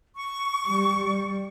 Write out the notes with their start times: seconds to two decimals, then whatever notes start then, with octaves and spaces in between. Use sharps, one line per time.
0.16 C#6
0.67 G3